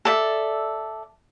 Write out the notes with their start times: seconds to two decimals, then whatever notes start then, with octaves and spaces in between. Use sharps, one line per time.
0.05 A4 D5 E5